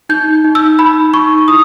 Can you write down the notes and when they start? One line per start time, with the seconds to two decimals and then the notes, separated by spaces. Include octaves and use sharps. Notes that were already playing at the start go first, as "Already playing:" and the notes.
0.09 D#4 G6
0.44 D#4
0.55 E6
0.79 D#4 B5
1.14 D#4 C#6
1.48 E4 D#6